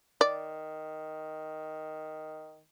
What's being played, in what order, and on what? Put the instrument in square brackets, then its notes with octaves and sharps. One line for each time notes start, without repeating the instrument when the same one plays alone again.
[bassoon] D#3 [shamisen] D5